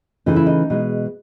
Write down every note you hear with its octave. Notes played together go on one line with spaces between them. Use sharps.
C#3 E3 A3 D#4
E4
D#4
B2 G#3